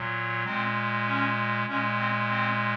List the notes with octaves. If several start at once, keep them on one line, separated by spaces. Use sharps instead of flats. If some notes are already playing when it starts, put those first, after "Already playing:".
Already playing: A#2 F#3
A#2 G#3 C4
C#4
A#2 G#3 C#4
C4
C4